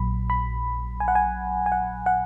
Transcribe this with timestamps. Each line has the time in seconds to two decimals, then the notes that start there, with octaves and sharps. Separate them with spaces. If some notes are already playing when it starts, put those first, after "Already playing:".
Already playing: A#1 A#2 F#3 B5
0.30 B5
1.00 G#5
1.08 F#5
1.15 G#5
1.66 G#5
1.72 F#5
2.06 F#5